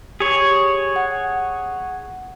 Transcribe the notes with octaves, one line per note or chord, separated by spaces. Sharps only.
G4 G#4 C#5
F#5